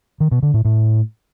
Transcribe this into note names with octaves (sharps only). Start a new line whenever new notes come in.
D#3
B2
D3
A2
A2